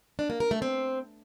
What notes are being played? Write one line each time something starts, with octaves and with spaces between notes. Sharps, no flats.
D4
A#3
A#4
A3
C4